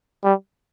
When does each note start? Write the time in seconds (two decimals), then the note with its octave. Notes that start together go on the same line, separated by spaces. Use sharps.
0.24 G3